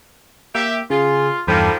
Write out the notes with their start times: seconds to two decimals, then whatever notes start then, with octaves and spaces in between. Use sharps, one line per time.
0.55 A#3 G4 E5
0.90 C#3 F4 G#4
1.47 E2 G2 D#3 F3 G3 A4 B5